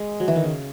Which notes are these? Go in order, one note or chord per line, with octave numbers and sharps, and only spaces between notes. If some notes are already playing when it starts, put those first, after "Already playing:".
Already playing: G#3
F#3
E3
D#3
C#3